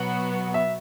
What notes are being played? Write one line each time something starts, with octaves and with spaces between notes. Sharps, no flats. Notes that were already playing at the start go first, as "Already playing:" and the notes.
Already playing: B2 F#3 B3 F#4 F#5
E5